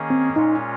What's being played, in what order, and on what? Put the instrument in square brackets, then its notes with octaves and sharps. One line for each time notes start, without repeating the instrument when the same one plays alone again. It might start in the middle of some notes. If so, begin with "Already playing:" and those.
Already playing: [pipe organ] D#3 A#3 C#4 G#4
[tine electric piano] C4
[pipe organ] A#2 G#3 C#4 F4 [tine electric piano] D#4